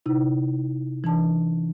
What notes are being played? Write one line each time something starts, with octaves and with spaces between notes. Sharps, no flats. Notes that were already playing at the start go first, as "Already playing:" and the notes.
C3 D#4 E4
E3 D4 A5